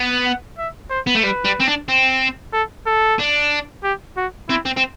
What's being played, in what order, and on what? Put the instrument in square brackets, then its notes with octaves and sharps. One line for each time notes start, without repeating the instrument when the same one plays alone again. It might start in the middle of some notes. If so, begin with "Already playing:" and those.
Already playing: [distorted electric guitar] B3
[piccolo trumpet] F#5
E5
C5
[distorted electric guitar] B3
A3
[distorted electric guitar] G3 [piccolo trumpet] B4
[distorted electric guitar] G3
C4
D4
C4
[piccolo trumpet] A4
A4
[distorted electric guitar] D4
[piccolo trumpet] G4
F#4
[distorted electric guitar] C4 [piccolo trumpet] E4
[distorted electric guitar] C4
C4